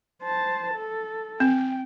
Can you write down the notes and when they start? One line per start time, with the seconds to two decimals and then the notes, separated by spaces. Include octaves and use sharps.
0.22 C5 A5
0.74 A4
1.40 C4 G5